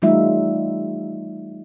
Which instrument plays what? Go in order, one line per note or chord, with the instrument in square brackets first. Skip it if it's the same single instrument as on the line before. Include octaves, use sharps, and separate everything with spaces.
[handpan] E3 G3 A3 D#4 F4 E5